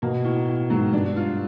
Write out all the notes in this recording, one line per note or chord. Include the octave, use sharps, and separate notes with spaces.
B2 A#3
A2
A2
G#2 F#3
G2 D4
F4